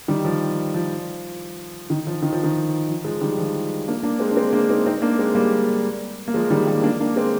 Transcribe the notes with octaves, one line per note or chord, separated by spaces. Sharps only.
D#3 G3
F3
F3
D#3
F3
D#3
F3
D#3
F3
F3 G#3
D#3 G3
F3
A#3 D4
A#3 D4
G#3 C4
D4
G#3 C4
A#3 D4
C4 D#4
C4 D#4
A#3 D4
G#3 C4
G3 A#3
A#3
F3 G#3
D#3 G3
G3 A#3
A#3 D4
A#3 D4
G#3 C4